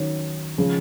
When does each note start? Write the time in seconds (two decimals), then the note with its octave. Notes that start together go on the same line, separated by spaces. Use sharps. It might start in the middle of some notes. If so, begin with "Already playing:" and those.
Already playing: D#3 F#3 C#4
0.58 C#3 F3 G#3